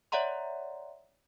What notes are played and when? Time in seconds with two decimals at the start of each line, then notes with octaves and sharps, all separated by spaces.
0.12 C#5 D5 E5 F#5 A#5 C6